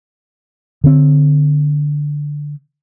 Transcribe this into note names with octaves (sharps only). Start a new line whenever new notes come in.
D3 C4